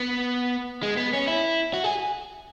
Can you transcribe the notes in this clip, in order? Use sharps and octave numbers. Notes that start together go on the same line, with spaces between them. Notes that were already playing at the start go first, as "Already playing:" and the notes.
Already playing: B3
G#3
B3
C#4
E4
F#4
G#4